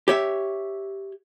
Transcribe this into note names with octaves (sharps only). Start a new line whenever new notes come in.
G4 C#5 E5